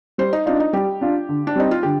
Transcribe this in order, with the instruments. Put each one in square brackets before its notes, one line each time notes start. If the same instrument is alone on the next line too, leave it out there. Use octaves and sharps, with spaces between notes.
[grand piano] G3 [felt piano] C5
[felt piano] D#4
[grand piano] D4 F4 [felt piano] D#4
[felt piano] D#4
[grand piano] G3 [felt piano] G4
[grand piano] D4 F4
D3
[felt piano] D4
[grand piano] G3 C4 [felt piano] D#4
[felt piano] F4
[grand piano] D3 [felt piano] G4